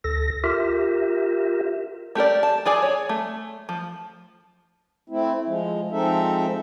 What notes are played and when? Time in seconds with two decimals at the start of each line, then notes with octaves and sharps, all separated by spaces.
0.04 D2 A4 A#6
0.44 F4 G4 A#4 E5
2.15 A3 G4 A#4 D5
2.43 A5
2.65 F4 G#4 D5 G#5
2.82 C#5
3.09 A3
3.69 F3
5.10 A3 C4 E4
5.47 F3 G#3
5.92 F3 G#3 C4 D#4 A4 E5